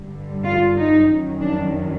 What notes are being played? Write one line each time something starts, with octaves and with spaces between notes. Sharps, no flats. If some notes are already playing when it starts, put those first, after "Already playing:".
Already playing: G2 D3 G3
F4
D#4
F#2 D#3 F#3
D4